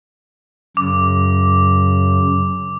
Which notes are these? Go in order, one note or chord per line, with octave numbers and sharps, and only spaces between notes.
F#2 C#3 D6